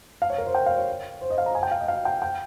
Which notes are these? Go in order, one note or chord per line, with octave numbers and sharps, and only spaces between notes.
F5
C#5
A#4
C5
G5
F5
C#5
C5
D#5
F5
A#5
G#5
G5
F5
D#5
F5
G5
G5